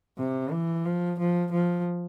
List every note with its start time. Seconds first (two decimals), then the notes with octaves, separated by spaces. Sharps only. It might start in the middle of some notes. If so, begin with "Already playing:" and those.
0.18 C3
0.51 E3
0.85 F3
1.19 F3
1.52 F3